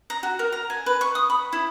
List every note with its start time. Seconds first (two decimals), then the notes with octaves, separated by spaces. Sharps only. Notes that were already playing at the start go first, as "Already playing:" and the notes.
0.10 A#5
0.23 F#4
0.39 A#4
0.52 A#5
0.70 G#5
0.86 B4
1.01 C#6
1.15 D#6
1.30 B5
1.53 E4